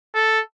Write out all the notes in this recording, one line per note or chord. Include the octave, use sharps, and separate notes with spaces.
A4